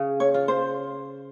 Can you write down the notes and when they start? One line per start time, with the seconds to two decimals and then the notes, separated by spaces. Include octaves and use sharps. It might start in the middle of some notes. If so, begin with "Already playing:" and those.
Already playing: C#3
0.20 C#5
0.34 F4
0.48 C5